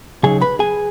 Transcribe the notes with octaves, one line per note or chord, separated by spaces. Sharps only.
C#3 F#3 D#4 G#4 G#5
B4 B5
G#4 G#5